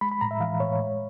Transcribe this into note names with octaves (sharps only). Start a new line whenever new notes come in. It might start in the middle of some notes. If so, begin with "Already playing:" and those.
G#3 B5
B5
A2 A#5
E5
E3 F5
A2 C#5
G#3